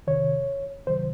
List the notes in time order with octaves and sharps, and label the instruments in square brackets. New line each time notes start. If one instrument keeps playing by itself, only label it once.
[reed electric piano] F2 C3 D#3 C#5
C#2 C3 D#3 F#3 C5